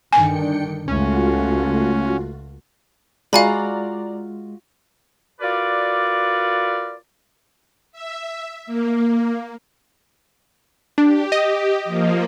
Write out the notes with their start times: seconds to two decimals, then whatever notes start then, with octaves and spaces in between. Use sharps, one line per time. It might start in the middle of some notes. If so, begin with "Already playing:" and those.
0.13 G2 D3 D#3 D4 G5 G#5 C#7
0.88 C#2 A3 C#4 F4 F#4
3.33 G#3 F4 F#4 D5 F5 G#5 A#5 B5
5.41 F4 F#4 A#4 B4 D5
7.92 E5
8.66 A#3
10.98 D4 G4
11.32 G4 D#5
11.85 F3 A#3